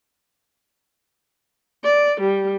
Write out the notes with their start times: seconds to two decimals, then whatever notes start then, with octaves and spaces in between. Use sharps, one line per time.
1.84 D5
2.21 G3